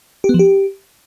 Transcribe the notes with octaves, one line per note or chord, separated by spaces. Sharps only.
G4
B3
F3
G4